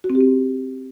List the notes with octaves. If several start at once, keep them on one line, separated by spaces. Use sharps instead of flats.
F#4
C4
G4
C4